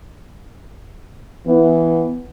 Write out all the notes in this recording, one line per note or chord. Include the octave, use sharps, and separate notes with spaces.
E3 B3